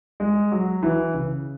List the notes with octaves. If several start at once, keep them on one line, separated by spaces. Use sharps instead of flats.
G#3
F#3
E3
C#3